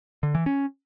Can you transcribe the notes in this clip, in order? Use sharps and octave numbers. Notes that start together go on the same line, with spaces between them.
D3
E3
C#4